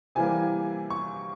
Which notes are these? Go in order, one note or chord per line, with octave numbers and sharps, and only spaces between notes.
C3 E3 G3 A#3 G#5
C#6